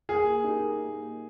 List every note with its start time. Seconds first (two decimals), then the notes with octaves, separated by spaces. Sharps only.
0.09 A#3 G#4
0.44 D#4 G4 A#4
0.79 A#3